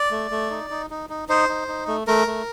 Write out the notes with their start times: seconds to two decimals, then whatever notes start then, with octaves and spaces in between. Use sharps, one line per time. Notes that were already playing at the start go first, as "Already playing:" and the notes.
Already playing: D5
0.11 A3
0.31 A3
0.51 D#4
0.70 D#4
0.90 D#4
1.10 D#4
1.29 D#4 C5
1.49 D#4
1.68 D#4
1.87 A3
2.07 A3 A#4
2.27 A3